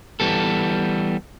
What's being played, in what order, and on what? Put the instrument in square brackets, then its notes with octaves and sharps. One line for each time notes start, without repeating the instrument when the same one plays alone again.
[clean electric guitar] E3 G3 B3 A4